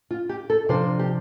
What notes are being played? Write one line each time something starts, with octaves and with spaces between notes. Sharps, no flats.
F4
G4
A4
C3 F3 D4 C5
G4